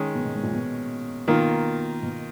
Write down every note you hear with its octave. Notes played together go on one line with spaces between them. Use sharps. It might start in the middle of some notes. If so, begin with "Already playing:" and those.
Already playing: D#3 G#3 C#4
B2
B2
G#2
A#2
B2
B2 D#3 A#3 F4
B2